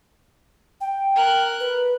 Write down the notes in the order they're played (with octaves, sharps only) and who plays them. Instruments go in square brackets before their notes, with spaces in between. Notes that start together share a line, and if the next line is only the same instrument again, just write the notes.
[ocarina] G5
[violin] A#4 F#6
[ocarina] B4